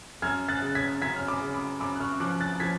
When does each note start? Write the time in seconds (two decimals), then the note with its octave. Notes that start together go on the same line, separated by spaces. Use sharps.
0.22 F#2 F6 G#6
0.49 F#6 A6
0.62 C#3
0.75 G#6 B6
1.01 F#2 G#6 B6
1.16 F6
1.27 B5 D6
1.41 C#3
1.54 B5 D6
1.80 F#2 B5 D6
1.95 F#6
2.00 C#6 F6
2.20 F3 D6 F#6
2.40 F#6 A6
2.60 F3 G#6 B6